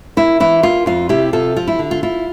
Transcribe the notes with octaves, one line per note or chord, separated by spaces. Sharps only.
A#3 E4
E3 E4
A#3 F4
F2 F4
C3 E4 G4
C3 F4 A4
F3 F4
E4
D3
F4
E4 F4